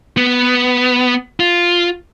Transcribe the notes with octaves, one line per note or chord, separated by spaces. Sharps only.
B3
F4